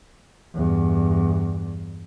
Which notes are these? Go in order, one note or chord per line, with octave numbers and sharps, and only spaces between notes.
E2 G2